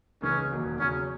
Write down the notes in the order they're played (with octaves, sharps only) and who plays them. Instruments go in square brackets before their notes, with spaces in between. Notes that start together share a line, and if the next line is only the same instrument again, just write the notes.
[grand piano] C#2 C#3 E3 [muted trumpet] C#4
[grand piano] E1 D#2 D#3 F#3
[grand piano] E2 C#3 F#3 [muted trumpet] C#4